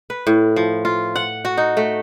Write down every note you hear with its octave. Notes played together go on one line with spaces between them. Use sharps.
B4
A2
F3
F4
F#5
F#4
D#4
A3